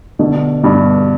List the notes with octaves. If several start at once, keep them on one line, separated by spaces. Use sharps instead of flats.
B2 D3
G2 B2